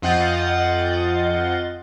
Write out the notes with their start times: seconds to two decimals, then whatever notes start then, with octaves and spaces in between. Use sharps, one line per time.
0.02 F2 F4 D#5 F#5 G6 A6